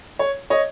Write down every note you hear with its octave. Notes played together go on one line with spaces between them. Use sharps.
C#5
C#5 D#5